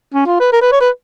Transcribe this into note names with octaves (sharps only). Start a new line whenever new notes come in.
C#4
F4
B4
A#4
B4
C#5
B4